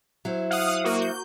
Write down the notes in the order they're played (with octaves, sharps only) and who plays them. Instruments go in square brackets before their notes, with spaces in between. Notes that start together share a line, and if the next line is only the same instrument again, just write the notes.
[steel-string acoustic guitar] F#3 E4 C5
[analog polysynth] F5 F#5 D#6
A#3 F#4
G6